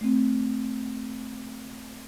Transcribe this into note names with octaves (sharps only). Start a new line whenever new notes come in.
A3 C4